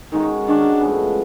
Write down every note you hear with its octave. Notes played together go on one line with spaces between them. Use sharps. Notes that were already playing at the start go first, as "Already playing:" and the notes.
D#3 G#3 C#4 D#4 F#4
D#3 G#3 C#4 D4 F#4
A2 F3 G#3 B3